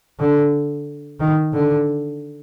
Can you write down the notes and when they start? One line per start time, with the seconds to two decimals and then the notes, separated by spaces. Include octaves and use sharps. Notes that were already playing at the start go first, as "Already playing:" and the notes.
0.20 D3
1.20 D#3
1.53 D3